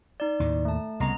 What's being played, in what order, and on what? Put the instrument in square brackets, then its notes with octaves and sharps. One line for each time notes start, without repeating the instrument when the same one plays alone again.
[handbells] D#4 D5
[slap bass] D#2 A2 D#3
[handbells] A3 A5
[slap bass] C2 C#3 [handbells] B3 D#5 A#5